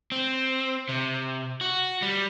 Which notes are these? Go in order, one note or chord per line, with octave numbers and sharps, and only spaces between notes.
C4
C3
F#4
G3